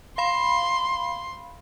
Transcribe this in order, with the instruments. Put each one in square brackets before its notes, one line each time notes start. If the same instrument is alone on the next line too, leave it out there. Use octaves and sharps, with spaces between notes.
[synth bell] F5 B5 [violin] C6